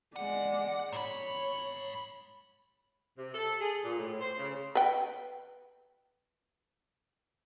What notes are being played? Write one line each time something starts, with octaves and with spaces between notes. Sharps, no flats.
G#3 D5 F#5
G#2 C#5 B5
C3
A4
G#4
A#2
A2
C5
C#3
B4 G5